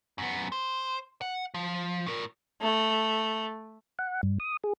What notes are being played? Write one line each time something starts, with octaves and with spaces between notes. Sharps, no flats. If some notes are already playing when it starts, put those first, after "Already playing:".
F#2 B3
C5
F#5
F3
A2 A#4
A3
F#5
G2
D#6
G#4